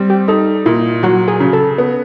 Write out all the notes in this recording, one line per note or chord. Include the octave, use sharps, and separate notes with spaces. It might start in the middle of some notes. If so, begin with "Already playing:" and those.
Already playing: G3 C4
G4
D#4 A4
A#2 E4
F#3 F#4
G#4
C#3
A4
B3